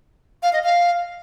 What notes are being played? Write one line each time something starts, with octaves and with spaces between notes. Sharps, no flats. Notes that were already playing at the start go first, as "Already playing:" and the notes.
F5
D#5
F5